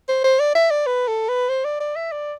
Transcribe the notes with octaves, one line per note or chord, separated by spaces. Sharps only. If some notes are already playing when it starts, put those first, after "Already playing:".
C5
C5
D5
E5
D5
B4
A4
B4
C5
D5
D5
E5
D5